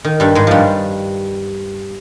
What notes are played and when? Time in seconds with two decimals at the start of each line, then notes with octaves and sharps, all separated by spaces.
0.05 D#3
0.20 G2 G3
0.35 G#2 G#3
0.47 G2 F3 G3